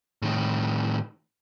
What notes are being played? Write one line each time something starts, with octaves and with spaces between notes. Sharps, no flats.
A2 D#3